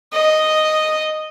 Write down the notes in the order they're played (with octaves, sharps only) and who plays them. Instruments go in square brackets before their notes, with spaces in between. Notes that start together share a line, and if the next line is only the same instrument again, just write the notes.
[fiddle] D#5